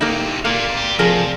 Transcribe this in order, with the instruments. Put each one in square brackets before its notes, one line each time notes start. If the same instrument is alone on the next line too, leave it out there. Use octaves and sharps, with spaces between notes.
[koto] A#3 D#4 [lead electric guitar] E4 G4
[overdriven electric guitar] A#2 [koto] A#3 [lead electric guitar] D5 F5
[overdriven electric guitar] G4
[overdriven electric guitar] C3 [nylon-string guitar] F3 G#4 [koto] A#4